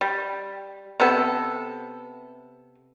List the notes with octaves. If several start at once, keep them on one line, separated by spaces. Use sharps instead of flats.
G3
C3 B3 A4